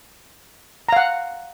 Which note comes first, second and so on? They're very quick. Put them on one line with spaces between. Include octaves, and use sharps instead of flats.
A#5 F5 F#5